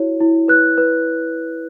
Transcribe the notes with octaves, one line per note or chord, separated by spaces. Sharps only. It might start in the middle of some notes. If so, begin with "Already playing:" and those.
Already playing: E4 F#4 C#5
E4
B4 F#6
B4